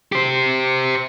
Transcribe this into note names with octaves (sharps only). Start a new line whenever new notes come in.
G4 C5